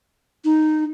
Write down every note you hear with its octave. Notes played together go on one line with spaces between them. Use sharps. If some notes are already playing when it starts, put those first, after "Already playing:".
D#4